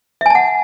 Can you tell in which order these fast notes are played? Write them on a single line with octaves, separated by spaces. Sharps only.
E5 G#5 A5 F#5